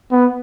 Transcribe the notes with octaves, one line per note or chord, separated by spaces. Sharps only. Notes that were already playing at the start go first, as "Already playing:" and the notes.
B3